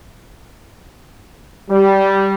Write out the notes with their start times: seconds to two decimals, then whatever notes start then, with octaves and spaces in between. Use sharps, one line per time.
1.70 G3